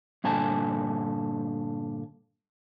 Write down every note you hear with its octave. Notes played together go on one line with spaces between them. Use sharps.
G2 A#2 D3 G#5 A5